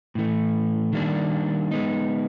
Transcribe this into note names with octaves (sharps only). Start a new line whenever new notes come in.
A2 E3 A3
D#3 G3 A#3 D4
G#3 B3 D#4